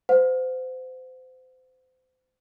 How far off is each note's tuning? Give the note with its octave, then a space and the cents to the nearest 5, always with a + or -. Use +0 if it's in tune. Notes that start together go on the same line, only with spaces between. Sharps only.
C5 -30 F#5 -35